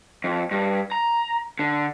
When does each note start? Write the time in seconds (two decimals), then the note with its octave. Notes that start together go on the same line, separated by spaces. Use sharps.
0.24 F2
0.51 G2
0.92 A#5
1.59 D3